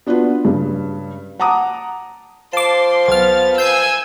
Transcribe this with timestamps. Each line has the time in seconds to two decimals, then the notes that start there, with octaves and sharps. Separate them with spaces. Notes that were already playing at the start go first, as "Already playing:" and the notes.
0.07 B3 D4 F4 F#4 B4
0.45 G2 C#3
1.39 F#5 A5 A#5 D6 D#6
2.53 F3 A5 C6 D6
3.08 B1 B3 F6 A6
3.58 G#5 E6 G6 C7